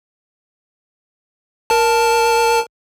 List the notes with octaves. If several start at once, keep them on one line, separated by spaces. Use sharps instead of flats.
A#4 A5